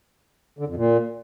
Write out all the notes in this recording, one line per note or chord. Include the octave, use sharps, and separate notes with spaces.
D3
F2
A#2